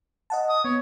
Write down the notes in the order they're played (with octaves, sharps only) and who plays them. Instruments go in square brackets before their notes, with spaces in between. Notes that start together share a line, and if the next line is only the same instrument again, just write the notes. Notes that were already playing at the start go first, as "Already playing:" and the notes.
[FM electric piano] D#5 F#5 A5
[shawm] D#6
[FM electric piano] B3 [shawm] C#5